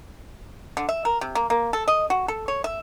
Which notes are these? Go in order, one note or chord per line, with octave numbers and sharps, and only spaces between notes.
D3
E5
A#4
C3
A#3
A#3
A4
D#5
F#4
A4
C#5
E5